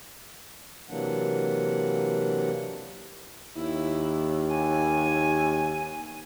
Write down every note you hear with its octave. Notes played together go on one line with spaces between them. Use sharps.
C3 E3 F#3 A#3 D4 F#5
D#2 E4
G#5